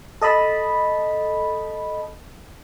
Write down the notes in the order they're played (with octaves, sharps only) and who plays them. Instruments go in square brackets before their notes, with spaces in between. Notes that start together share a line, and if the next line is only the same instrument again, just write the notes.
[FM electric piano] A4 D#5 A5 B5